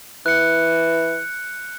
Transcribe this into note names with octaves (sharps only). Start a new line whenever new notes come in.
E3 F#6 C#7